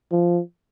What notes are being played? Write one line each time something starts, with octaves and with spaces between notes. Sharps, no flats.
F3